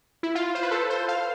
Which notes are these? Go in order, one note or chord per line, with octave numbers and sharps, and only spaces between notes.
E4
F4
C5
B4
A4
C5
F5